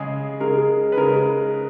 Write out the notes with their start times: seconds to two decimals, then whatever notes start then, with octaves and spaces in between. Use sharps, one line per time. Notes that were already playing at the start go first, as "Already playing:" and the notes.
Already playing: C#3 G#3 G#4
0.40 C#3 G#3 A#4
0.92 B4
0.97 C#3 G#3 A#4